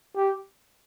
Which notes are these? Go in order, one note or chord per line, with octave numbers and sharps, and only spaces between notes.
G4